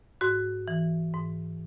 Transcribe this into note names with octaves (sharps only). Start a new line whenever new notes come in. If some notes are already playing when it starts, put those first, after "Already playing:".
G#2 F#4
E3
G#2